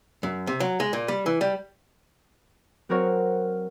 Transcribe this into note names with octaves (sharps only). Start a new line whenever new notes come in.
F#2
C3
F#3
G#3
A#2
G3
E3
G3
F#3 C4 F#4 A#4 C#5